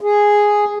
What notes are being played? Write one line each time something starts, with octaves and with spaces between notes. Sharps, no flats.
G#4